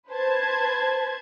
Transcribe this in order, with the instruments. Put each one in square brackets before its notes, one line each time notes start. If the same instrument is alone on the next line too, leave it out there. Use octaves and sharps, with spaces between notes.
[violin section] B4 C5 A5 G#6